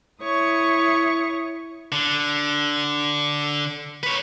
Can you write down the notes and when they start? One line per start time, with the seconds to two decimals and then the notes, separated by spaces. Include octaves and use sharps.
0.22 E4 C#5 C#6 D#6
1.92 D3
4.03 B4 C#5